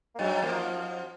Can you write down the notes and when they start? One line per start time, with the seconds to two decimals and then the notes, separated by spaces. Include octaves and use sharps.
0.15 A#3
0.19 F#2 F#3 G#3
0.31 G#3
0.42 F2 F3 A#3
0.54 A#3